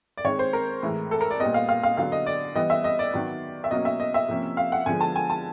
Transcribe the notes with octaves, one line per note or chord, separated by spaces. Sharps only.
D5
D#3 G#3 C4 C#5
C5
A#4
A2 E3 G#3
A4
A#4
D5
A#2 G3 B3 D#5
F5
F5
F5
D3 F#3 B3 F5
D#5
D5
E3 G3 B3 D#5
E5
D#5
D5
D#3 F#3 B3
E5
B2 F#3 A#3 C#4 D#5
E5
D#5
E5
C3 F3 A#3 C#4
F5
F#5
D3 F3 G#3 B3 G#5
A5
G#5
A5